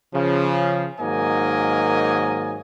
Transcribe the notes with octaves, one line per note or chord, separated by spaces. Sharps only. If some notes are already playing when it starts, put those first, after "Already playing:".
C#3 F3
G#2 D#3 F#3 A#3 D#5 G#5